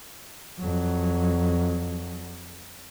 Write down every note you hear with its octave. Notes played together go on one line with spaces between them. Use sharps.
F2 F#3